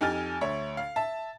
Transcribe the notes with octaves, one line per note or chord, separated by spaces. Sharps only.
F2 D#4 G4 G#5 F6 A6
D2 C#5 E5
F5
E5 A5